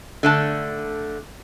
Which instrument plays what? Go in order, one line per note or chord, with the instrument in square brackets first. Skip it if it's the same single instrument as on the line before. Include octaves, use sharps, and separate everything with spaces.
[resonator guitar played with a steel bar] D3 A3 A5